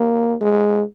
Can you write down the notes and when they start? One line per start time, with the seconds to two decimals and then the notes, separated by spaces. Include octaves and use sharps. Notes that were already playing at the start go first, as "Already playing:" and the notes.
Already playing: A#3
0.41 G#3